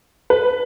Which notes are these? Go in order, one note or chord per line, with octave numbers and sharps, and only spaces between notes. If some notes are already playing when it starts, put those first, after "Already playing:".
B4